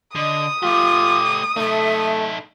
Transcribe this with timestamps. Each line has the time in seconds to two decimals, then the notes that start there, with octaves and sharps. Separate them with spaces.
0.15 D3 D#5 D#6
0.63 A3 F4 G4 D6
1.57 A3 D#4 A4 E5